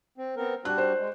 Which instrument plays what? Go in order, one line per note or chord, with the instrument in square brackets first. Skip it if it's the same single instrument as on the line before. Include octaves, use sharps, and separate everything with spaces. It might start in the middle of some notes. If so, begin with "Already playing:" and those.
[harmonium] C4
B3 C4 A#4
[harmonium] G3 D4 F#4 [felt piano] F#6
[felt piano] C5
[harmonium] G#3